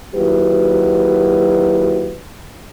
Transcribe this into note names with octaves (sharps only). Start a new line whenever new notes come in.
D#2 F#3 E4 F#4 G4 B4